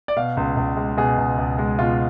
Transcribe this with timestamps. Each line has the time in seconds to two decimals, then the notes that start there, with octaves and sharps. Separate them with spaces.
0.08 D5
0.17 B2 F5
0.37 C#2
0.57 C#2
0.77 G#3
0.97 B2 G#4
1.18 C#2
1.38 C#2
1.58 G#3
1.79 B2 F4